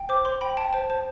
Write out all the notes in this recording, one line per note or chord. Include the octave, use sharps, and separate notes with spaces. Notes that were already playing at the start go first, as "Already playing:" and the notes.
Already playing: G5
C5 D6
C5 C6
G5 B5
G5 A5
C5 A5
C5 A5